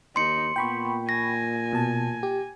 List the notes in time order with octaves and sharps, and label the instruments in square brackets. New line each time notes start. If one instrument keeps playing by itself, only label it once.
[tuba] D#2 [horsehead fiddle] D#4 [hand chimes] C6 C#7
[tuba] A#2 [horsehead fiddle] B3 [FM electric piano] G5 B5 C#6
[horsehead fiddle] G#5 [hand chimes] A#6
[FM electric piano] B2 A5
G4